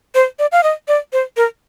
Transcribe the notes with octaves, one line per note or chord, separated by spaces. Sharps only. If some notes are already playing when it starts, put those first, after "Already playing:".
C5
D5
F5
D#5
D5
C5
A#4